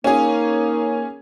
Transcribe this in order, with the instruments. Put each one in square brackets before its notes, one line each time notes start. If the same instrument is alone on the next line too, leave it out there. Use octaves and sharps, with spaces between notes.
[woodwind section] A#3 D#4 [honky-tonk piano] C#4 G#4